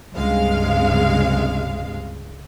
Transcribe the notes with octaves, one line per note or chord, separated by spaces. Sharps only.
C#2 G2 C3 G#3 F5